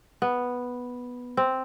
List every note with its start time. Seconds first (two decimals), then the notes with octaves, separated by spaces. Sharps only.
0.22 B3
1.37 C4